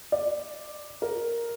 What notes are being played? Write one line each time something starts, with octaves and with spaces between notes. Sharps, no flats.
D5
A#4